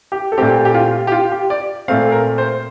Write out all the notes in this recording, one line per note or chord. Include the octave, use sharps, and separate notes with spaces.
G4
A4
A#2 A3 C4 G4
G4
F4
G4
F4
G4
D5
A#2 A3 C4 F5
A#4
C5